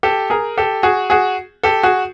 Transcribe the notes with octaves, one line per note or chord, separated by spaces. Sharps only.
G4 A4
G#4 A#4
G4 A4
F#4 G#4
F#4 G#4
G4 A4
F#4 G#4